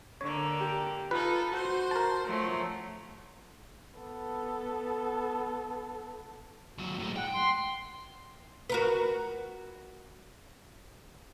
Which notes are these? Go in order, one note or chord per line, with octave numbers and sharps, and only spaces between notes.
D3 A#3 C#5
G4
D#4 F4 A4 B4
F#4 C5 C6
A#4 A5
F3 F#3 A3
B3 A4
D#2 F#3
A2 G#3
F#5 G5
C6
F#4 A#4 B4